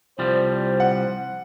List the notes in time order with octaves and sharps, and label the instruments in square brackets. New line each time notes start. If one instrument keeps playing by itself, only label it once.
[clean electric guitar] C2 F3 G3 [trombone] C5
[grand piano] F#5